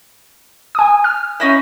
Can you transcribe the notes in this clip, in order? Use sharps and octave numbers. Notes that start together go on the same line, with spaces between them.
G#5 D#6
F6
C#4 D#4 E4